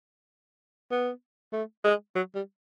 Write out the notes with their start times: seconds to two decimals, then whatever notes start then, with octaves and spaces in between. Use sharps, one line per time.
0.91 B3
1.53 A3
1.84 G#3
2.15 F#3
2.35 G3